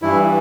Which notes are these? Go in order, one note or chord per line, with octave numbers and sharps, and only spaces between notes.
G2 E3 E4